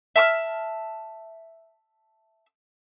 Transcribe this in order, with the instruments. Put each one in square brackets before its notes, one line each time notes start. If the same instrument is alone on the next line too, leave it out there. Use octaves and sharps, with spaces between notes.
[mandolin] E5 A5 C#6 F6